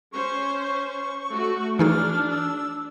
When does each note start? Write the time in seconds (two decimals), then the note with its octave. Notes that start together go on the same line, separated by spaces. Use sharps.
0.13 C#4 C5 C#6
0.62 C#6
1.32 A3 F#4
1.79 E3 D4 D#4 G#4 F6
2.31 E6